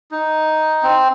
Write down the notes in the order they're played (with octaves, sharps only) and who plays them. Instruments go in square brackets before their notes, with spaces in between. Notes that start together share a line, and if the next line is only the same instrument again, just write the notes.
[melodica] D#4
C4